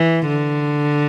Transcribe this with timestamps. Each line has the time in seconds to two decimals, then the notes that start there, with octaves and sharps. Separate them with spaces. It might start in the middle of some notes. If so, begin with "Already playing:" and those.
Already playing: E3
0.28 D3